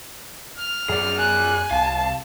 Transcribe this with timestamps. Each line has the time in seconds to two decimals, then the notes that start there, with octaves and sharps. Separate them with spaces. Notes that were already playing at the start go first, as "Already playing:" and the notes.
0.58 F6
0.89 F#2 G#4 D5
1.18 G#5 F#6
1.71 C2 F5 A5